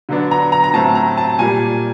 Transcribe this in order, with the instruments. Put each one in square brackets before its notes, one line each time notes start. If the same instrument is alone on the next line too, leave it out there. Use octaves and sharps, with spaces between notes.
[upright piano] D3 F#3 B3 D4
A#5
A#5
A#5
A2 F#3 A3 C4 A5
A#5
A5
A#2 G3 A#3 G#5